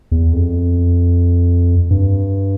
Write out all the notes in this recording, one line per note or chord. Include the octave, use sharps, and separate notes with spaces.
E2
F2
G2